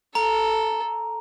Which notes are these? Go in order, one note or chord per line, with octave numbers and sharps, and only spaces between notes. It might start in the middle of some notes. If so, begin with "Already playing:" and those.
A4 A#5